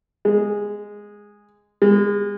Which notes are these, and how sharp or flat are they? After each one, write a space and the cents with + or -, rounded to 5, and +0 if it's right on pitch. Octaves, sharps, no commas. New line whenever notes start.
G#3 -5
G#3 -30